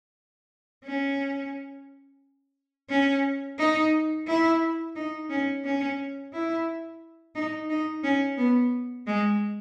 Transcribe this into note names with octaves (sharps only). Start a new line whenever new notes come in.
C#4
C#4
D#4
E4
D#4
C#4
C#4
E4
D#4
D#4
C#4
B3
G#3